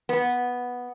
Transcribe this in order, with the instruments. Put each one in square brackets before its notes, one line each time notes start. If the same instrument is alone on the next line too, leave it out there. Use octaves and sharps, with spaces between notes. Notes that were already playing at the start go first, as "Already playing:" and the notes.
[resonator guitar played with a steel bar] B3